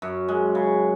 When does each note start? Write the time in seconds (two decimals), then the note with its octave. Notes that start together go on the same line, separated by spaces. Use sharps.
0.02 F#2
0.28 G#3
0.55 C#3